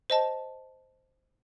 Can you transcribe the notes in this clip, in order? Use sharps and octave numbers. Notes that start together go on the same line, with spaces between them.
C5 D#5 A5